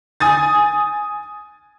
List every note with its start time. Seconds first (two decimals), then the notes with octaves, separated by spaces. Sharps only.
0.20 G#5 D#6 A6